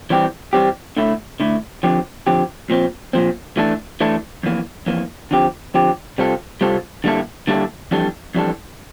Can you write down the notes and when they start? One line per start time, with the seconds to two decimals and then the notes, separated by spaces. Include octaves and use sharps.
0.10 E3 G3 C4 G4
0.53 E3 G3 C4 G4
0.97 D2 D3 A3 E4
1.40 D2 D3 A3 E4
1.83 F2 D3 F3 C4 G4
2.27 F2 D3 F3 C4 G4
2.70 A#2 F3 C4
3.13 A#2 F3 C4
3.57 E3 A3 D4 A4
4.01 E3 A3 D4 A4
4.43 F2 E3 A#3
4.86 F2 E3 A#3
5.31 D3 F3 C4 G4
5.74 D3 F3 C4 G4
6.18 C3 G3 C4 F4 A4
6.61 C3 G3 C4 F4 A4
7.04 D3 G3 A#3 E4 A4
7.47 D3 G3 A#3 E4 A4
7.91 F2 E3 G3 D4 A4
8.35 F2 E3 G3 D4 A4